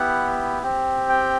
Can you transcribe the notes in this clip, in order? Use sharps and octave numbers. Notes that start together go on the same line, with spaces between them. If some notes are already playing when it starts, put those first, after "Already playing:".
Already playing: B3 E4 G4 F#5
C4 G4
G5